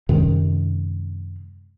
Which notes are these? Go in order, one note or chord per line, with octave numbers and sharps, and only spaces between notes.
F#2 C3 D#3 G#3